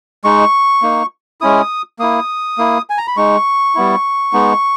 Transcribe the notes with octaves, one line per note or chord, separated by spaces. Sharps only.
G#3 D#4 C#6
A#3 D#4
G#3 C#4 E4 D#6
A#3 E4 D#6
A#3 E4
G#5
A#5
B5
G#3 D#4 C#6
G3 B3 E4
G#3 B3 D#4